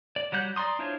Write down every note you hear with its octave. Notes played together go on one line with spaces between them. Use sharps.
D5
F#3 G3 F#5 G6
D5 A#5 C6 D#6
D4 E4 F4 C5 C#5